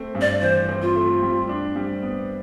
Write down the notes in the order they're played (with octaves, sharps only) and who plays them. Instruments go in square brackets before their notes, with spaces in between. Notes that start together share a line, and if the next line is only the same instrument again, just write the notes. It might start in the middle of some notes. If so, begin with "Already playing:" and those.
Already playing: [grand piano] A3 C4
G2
[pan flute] D5
[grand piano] E3 [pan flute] C5
[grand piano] C4
[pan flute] F4
[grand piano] A3
G3
D4
G3
B3